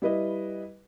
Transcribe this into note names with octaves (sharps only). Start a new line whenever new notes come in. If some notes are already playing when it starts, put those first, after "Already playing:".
G3 E4 B4 D#5